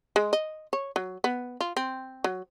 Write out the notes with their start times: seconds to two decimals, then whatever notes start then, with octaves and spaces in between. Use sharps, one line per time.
0.16 G#3
0.33 D#5
0.73 C#5
0.96 F#3
1.24 B3
1.61 F4
1.77 C4
2.24 F#3